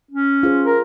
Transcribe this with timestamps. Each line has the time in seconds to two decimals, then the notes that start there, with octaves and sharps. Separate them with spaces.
0.11 C#4
0.43 F4 G#4 C5
0.65 A#4